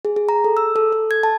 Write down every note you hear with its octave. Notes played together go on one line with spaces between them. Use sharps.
G#4
G#4
A#5
A4
E6
A4
A4
G#6
A5